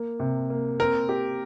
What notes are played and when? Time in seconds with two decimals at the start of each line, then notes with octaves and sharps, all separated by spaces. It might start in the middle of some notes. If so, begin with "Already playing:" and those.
Already playing: A#3
0.20 C3
0.50 A#3
0.80 C4 A#4
1.09 G4